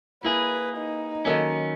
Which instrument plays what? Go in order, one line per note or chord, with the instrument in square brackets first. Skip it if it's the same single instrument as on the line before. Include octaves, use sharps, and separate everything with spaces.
[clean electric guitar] A#3 G#4 [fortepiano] E4 [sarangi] B4
[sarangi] D#4
[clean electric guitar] D#3 F#3 C#4 [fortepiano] A#3 A4 D#5